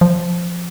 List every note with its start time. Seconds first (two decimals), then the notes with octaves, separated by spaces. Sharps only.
0.01 F3